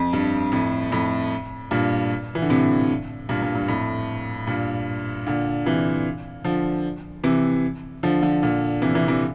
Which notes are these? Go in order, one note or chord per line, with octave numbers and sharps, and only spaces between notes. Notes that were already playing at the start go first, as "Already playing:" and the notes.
Already playing: F2
G2
F2 A2
F2 A2
G2 A#2
E3
D3
A2 C3
G2 A#2
G2 A#2
G2
F2 A2
G2 A#2
A#2 D3
C3 E3
D3 F3
C3 E3
D3 F3
D3 F3
A#2 D3
C3 E3
C3 E3
C3 E3